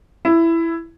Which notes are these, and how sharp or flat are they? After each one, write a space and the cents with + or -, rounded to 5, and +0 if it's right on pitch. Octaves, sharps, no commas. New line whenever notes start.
E4 +10